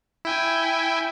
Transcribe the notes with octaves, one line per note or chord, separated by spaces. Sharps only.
E4 G5 G#5